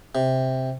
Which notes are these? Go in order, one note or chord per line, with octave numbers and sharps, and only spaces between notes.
C3